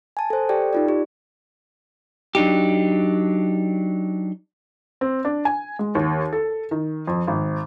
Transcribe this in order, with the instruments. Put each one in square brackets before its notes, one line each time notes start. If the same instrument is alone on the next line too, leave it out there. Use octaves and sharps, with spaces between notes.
[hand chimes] G#5 A5
A4 C5
G4 A4 D5 G5
D#4 F4 D5
G4
[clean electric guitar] F#3 D4 D#4 G4
[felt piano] C4
D4
G#5
G#3
D#2
A4
D#3
F2
G#1